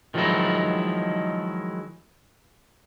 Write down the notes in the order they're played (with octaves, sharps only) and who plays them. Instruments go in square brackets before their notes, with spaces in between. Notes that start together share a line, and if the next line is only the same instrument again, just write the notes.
[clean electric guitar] D#3 F3 F#3 G#3 D#4 E4